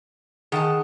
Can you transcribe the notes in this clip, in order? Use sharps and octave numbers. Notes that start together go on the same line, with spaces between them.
D#3 G#4 F#5 G5 A5 D#6